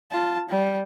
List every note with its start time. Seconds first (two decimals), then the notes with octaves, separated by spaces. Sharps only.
0.11 F4 A5
0.49 G3